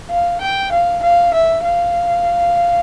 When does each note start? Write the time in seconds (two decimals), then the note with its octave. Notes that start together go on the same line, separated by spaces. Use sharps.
0.10 F5
0.41 G5
0.72 F5
1.03 F5
1.34 E5
1.64 F5